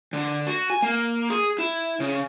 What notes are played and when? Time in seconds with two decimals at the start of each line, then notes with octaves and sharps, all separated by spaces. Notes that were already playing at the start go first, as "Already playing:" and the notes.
0.13 D3
0.47 F#4
0.70 G#5
0.82 A#3
1.30 G#4
1.58 E4
2.00 C#3